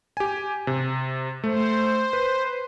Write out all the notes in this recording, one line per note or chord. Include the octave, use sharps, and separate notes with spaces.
G4 G#5
C3
A3 C5
B4